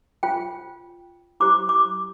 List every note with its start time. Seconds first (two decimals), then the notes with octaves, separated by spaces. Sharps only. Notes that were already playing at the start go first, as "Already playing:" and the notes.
0.23 F4 C5 G5
1.40 E4 G4 C5 D6
1.69 D6